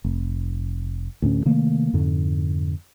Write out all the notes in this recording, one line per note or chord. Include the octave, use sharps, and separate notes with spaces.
F1
D2 A2 C#4
C3 D#3 A3 A#3
F2 G#2 D3